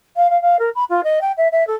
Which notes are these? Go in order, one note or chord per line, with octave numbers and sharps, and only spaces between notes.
F5
F5
F5
A#4
B5
F4
D#5
G5
E5
E5
A4